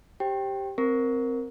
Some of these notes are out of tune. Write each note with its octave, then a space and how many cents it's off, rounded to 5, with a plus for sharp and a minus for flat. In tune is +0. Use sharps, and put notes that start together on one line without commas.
G4 +0 C5 +30 G5 +0
C4 +0 A#4 +0